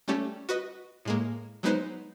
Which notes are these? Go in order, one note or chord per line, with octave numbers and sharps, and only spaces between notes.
G3 A3 C#4 G4 A4
F#4 B4 D#5
A2 G#3 A#3
F#3 G#3 B3 D#4 B4 C5